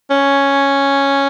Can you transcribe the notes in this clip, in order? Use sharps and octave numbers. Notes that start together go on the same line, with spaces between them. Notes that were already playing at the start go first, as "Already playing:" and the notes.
C#4